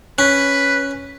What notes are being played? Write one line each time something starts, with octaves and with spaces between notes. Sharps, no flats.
C#4 B4 F#6